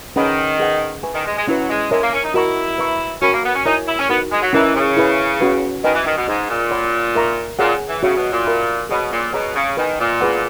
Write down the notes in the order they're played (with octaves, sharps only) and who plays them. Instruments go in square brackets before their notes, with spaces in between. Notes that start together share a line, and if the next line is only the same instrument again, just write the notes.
[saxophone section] D#3 [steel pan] C#4 G#4 B4 F#5 B5
[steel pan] G#4 B4 F#5
B4 E5 G#5 C#6
[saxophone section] D#3
G#3
G#3
[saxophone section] F#3 [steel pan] C#4 E4 B4
[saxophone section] G#3
[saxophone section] G#3 [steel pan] A#4 C#5 E5
[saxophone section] A#3
C#4
D#4
[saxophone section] E4 [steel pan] F#4 A#4 D#5 A#5 C#6
[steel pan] B4 E5 A#5 C#6
[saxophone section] C#4 [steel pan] F#4 A#4 C#5 G#5 B5
[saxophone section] A#3
B3
C#4
[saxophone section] D#4 [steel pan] E4 A#4 C#5 E5 G#5
[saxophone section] E4
C#4
[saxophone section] B3 [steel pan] D#4 F#4 A#4
[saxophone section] G#3
F#3
[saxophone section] E3 [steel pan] C#4 E4 A#4 D#5 A#5
[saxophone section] C#3
[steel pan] E4 G#4 B4 E5
C#4 F#4 B4
[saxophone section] D#3 [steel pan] B4 D#5 G#5 B5
[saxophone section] E3
D#3
B2
[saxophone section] G#2 [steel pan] G#4 D#5 A#5
[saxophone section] A#2
[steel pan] A#4 C#5 F#5 B5
A#4 E5 A#5 C#6
[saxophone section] A#2 [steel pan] G#4 C#5 F#5
[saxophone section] E3
[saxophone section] C#3 [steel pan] F#4 C#5 E5
[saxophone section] B2
A#2
[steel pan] A#4 E5 B5
[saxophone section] B2 [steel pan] G#4 C#5 F#5 B5
[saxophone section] A#2
[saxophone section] B2 [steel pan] G#4 C#5 F#5 A#5
[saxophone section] C#3
[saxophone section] D#3 [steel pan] B4 D#5 G#5
[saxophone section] A#2
[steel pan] G#4 B4 F#5